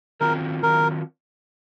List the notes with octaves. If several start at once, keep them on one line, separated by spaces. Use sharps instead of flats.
D#3 F#3 C4 F4 A#4
D#3 F#3 C4 F4 A#4